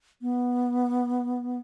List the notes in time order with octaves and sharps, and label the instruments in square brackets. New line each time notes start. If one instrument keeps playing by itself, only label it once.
[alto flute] B3